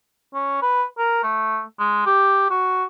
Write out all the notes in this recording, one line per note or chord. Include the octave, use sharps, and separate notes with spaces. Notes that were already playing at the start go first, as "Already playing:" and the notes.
C#4
B4
A#4
A3
G#3
G4
F#4